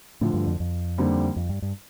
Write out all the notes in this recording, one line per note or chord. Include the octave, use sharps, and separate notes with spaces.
D2 A2 D3 F3
G2
F2
F2
D#2 D3 G3 C4
F2
G2
G2